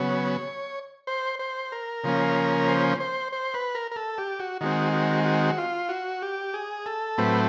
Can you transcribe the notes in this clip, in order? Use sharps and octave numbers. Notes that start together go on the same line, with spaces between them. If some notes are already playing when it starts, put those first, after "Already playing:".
Already playing: C#3 F#3 B3 C#5
C5
C5
A#4
C#3 F3 A#3 C#4
C5
C5
C5
B4
A#4
A#4
A4
G4
F#4
D#3 G#3 C4 F#4
F#4
F#4
F4
F#4
G4
G#4
A4
A2 F#3 A3 C4 B4